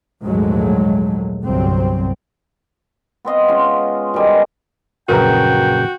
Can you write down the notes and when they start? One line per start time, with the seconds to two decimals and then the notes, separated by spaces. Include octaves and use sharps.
0.24 A#1 D#2 G#2 F#3 G#3 A3
1.45 G1 C2 F#3 C4
3.25 B3 C4 D#5 F5
3.48 G#3 C#4 F4
4.14 B2 D#3 G3 G#3
5.09 A#1 F#2 C#3 F#4 A#4 B4 G5 A#5